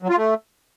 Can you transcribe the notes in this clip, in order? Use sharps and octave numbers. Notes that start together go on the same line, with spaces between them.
F#3
F4
A3